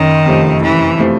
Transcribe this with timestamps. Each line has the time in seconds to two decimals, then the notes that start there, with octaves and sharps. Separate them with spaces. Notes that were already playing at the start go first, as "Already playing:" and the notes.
Already playing: F#1 D#3
0.26 F2 C3 F3 A3
0.62 F#1 E3
0.98 C3 F3 A3